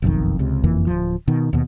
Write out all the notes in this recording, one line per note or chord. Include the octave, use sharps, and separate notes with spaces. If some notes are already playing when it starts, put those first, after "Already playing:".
F#1 B1 F2 D#3
C#2 C3
F#1 F2 E3 A#3
D1 F3
B2 D#3
D#2 B2